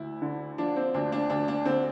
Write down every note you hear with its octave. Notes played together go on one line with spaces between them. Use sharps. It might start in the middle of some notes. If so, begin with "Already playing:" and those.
Already playing: D2 E4
D3
F3 D4
C4
D2 D4
D4
D2 D4
D4
D3 C4